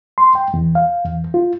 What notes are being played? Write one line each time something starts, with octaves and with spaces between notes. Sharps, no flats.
C6
G5
E2
F5
E2
F4